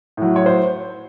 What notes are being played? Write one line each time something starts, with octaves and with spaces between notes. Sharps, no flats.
A2 F#3
C#5
C5